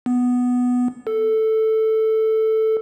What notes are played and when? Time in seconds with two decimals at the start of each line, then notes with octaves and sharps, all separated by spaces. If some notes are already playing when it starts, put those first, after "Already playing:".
0.06 B3
1.07 A4